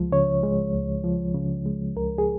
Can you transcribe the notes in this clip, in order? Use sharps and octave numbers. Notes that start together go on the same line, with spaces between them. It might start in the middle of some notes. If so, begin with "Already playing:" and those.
Already playing: C#2 F3 G#3
C#3 C#5
G#3
C#2
F3
C#3
G#3
C#2 A#4
G#4